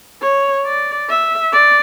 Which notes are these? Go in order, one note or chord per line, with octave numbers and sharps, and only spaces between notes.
C#5
D5
E5
D5